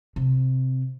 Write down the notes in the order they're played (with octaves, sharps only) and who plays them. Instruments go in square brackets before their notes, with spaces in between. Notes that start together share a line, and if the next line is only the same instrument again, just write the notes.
[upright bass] C3